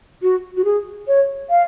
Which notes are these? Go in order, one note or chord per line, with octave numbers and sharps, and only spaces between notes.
F#4
F#4
G#4
C#5
F5